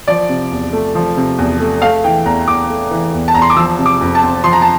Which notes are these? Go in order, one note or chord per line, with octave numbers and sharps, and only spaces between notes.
F3 D5
C3
E2
A3
F3
C3
E2
A3
A3 F5
E3 G5
E2 A#5
E2 D6
A3
E3
E2
A5
E2 A#5
C6
D6
F3 E6
C3
D6
F2
A5
C4
F3 C6
A#5
A5